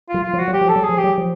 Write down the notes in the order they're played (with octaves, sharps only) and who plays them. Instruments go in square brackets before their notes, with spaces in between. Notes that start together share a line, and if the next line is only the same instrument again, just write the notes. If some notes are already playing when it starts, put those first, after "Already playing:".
[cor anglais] F4
[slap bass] F#3
[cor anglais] F4
[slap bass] F3
[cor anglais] F#4
[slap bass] F#3
[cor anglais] G4
[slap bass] F3
[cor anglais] A4
[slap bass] F#3
[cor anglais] G#4
[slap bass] F3
[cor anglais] G4
[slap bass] F#3
F3